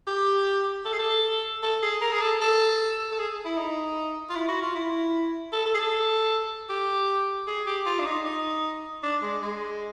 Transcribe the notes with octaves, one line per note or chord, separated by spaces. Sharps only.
G4
A4
G#4
A4
A4
G#4
A#4
G#4
A4
A4
A4
G#4
E4
D#4
F4
E4
F#4
F4
E4
A4
A4
G#4
A4
G4
G#4
G4
F4
D4
D#4
D#4
D4
G#3
G#3